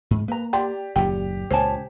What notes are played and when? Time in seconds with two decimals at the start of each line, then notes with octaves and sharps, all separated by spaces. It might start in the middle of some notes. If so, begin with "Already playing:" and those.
0.11 G#2
0.28 A#3 B4 A#5
0.53 G4 D5 G5 A#5 C6
0.96 F#1 D#2 A#2 G4 G5
1.51 C#2 A#2 C5 C#5 G#5 A5